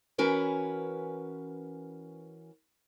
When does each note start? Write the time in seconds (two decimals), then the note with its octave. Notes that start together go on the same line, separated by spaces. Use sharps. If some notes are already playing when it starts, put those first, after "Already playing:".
0.18 E3 C#4 F#4 A#4 B4 G#5